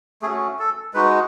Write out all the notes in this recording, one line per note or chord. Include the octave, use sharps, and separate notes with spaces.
A3 C#4 F#4 G#4
A4
G#3 D#4 F#4 B4